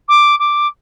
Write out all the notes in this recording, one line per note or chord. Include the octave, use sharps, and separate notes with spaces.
D6
D6